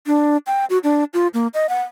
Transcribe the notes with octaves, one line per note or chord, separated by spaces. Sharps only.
D4
G5
F#4
D4
F4
A#3
D#5
F#5